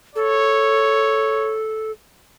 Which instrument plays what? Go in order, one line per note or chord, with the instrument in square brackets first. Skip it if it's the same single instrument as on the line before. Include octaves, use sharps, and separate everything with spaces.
[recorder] A4 [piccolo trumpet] C#5